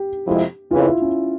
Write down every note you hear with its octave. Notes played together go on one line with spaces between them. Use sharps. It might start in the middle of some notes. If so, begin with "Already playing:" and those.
Already playing: G4
F2 C3 F3 G#3 E4
F2 C#3 E3 F4
E4
C#4